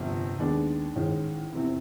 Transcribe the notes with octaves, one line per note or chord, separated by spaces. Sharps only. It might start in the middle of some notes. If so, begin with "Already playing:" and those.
Already playing: G1 F2 C3
D#2 D#3 G#3 B3 D4
A1 G#2 D#3 G#3 C#4
F1 E2 C3